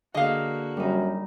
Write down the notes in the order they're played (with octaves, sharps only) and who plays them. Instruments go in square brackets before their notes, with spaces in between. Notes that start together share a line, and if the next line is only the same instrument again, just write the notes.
[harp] D3 G#4 [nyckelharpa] A#3 F#4 [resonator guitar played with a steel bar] D#5 F5
[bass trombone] F#2 [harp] G3 D#4